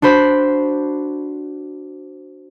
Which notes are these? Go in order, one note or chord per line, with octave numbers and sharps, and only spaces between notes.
D4 F#4 C5 B5